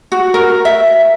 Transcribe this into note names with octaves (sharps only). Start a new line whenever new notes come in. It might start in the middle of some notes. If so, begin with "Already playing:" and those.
F#4
A#4
E5